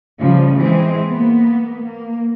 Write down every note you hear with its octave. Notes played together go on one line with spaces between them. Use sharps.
C#3 F3 G3
E3 G#3 C4
A#3 B3
A#3